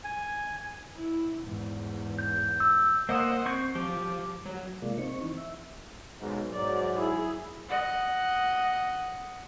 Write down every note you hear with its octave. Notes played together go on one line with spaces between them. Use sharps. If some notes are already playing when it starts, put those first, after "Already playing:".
G#5
E4
E2 G#2
G6
E6
A#3 C5 D#5 F#5 D#6 E6
C4 C#6 G6
F3 G4
F#3
C3 G#3 A#3 F4 D5
C4 D#4 C#6
E3
E5
B1 G#2
G#2 F#3 D5
E4 G#4
D#5 F#5